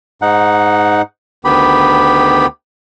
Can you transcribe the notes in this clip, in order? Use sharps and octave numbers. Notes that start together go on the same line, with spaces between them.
G#2 D#4 F#5
D2 D#3 B3 G4 B5